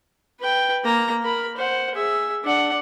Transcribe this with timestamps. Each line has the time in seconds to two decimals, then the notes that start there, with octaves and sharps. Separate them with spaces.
0.40 B4 G5
0.84 A#3 A#5
1.24 A#4 B5
1.57 C5 F#5
1.95 G#4 E5
2.44 D4 F#5